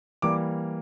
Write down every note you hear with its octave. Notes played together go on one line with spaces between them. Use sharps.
E3 G3 A#3 D6